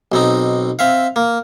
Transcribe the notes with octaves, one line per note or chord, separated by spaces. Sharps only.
B1 C4 D#4
C4 E5 F5
A#3